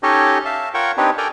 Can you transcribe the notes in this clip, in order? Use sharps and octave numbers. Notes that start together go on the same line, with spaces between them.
C#4 D#4 G4 A4 C#5 D#5
E5 F5 A5
F4 A#4 C#5 F#5 G5 C#6
C4 D4 D#4 G4 B4 C#5
A4 A#4 D5 G5 G#5 A#5